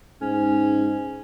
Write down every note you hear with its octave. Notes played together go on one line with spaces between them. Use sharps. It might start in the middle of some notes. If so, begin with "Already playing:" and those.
G#2 C#4